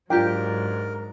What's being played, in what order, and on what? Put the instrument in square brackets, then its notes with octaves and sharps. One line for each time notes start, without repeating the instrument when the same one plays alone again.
[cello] G#2 F#3 [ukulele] D4 F4 G4 [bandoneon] A#4 [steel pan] G5